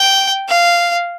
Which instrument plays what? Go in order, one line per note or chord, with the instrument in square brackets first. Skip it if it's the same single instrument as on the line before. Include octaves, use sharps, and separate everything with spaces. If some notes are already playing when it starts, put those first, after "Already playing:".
Already playing: [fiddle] G5
F5